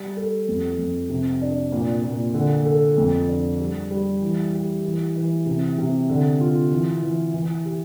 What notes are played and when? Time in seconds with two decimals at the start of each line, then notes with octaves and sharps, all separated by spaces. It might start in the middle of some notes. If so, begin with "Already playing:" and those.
Already playing: G3
0.17 A4
0.48 F2
0.79 F2
1.09 C3
1.41 D4
1.72 A#2
2.04 A#2
2.34 D3
2.65 A4
2.97 F2
3.28 D4
3.60 G3
3.91 G3
4.21 E3
4.53 G4
4.85 E3
5.16 E3
5.46 C3
5.78 C3
6.09 D3
6.40 F4
6.72 E3
7.02 E3
7.34 E3
7.65 G4